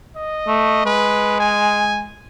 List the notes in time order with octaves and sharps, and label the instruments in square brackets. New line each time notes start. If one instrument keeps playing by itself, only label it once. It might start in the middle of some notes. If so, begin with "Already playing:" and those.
[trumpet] D#5
[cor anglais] A3
[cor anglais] G#3 [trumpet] B4
[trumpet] G#5